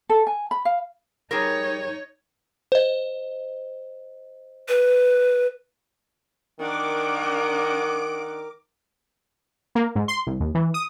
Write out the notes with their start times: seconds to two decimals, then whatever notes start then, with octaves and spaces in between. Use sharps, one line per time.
0.09 A4
0.27 G#5
0.51 B5
0.65 F5
1.31 G3 D#4 G#4 A#4 C#5
2.72 C5 D#5
4.68 B4
6.60 D#3 D4 A#4 F#5 D6
9.75 A#3
9.96 G#2
10.08 C6
10.27 C2
10.40 D#2
10.55 E3
10.74 D#6